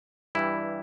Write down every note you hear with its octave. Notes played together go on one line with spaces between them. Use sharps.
G2 E3 G3 E4